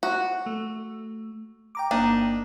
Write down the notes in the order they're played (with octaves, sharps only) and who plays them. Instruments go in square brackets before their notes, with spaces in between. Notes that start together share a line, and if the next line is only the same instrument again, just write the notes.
[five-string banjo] F#4
[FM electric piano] A3
G5 A#5 D6
[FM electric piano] G1 A#3 [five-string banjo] D4 D#4